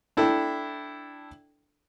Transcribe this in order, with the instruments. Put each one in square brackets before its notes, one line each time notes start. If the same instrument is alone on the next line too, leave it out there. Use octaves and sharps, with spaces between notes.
[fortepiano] D4 E4 A4 G5